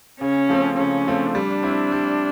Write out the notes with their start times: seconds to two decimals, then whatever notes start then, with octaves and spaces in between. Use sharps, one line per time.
0.21 C#3 C#4
0.49 F3 A3 C4
0.77 C#3 C#4
1.07 F3 A3 C4
1.35 G3 D4
1.63 C4 E4
1.92 G3